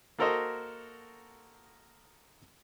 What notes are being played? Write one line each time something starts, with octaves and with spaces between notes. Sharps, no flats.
A#3 F#4 A4 A#4 C5 D#5